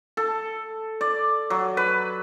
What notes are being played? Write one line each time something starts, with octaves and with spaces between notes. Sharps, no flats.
A4
D5
F#3
B4